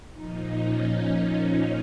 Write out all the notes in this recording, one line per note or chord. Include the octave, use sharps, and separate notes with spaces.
A#2 F3 D#4
C#4
D#4